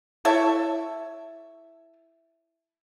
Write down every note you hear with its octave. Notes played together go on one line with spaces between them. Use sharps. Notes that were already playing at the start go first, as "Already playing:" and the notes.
E4 A4 C#5 E5